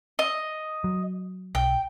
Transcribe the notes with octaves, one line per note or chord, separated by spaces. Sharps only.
D#5
F#3
B1 G5